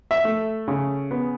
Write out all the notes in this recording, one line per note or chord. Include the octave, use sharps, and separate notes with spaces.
E5
A3
C#3
B3